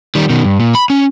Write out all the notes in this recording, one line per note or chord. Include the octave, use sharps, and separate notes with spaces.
D#3 G3
B2 D#3
G2
A#2
B5
C#4